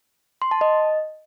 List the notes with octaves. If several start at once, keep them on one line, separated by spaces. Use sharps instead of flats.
C6
A5
D#5